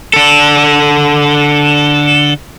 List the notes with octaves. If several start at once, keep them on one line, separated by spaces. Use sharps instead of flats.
D3 A4